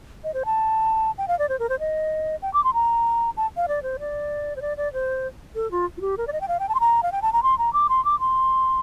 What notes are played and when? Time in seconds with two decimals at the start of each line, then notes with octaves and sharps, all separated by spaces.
0.24 D#5
0.34 C5
0.46 A5
1.18 G5
1.28 F5
1.39 D5
1.49 C5
1.59 A#4
1.69 C5
1.80 D#5
2.42 G5
2.54 D6
2.64 C6
2.74 A#5
3.37 A5
3.57 F5
3.68 D5
3.83 C5
3.99 D5
4.56 C5
4.62 D5
4.77 D5
4.93 C5
5.55 A4
5.71 F4
5.97 F4
6.01 G4
6.18 A#4
6.27 D5
6.33 D#5
6.41 G5
6.48 F5
6.60 G5
6.69 A5
6.75 C6
6.80 A#5
7.03 F5
7.12 G5
7.22 A5
7.33 A#5
7.43 C6
7.58 A#5
7.73 D6
7.89 C6
8.05 D6
8.20 C6